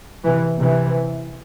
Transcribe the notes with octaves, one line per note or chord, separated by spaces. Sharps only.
C3 E3
C3 E3